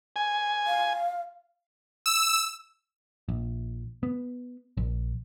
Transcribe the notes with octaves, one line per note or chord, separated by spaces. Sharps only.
G#5
F5
E6
A#1
B3
A#1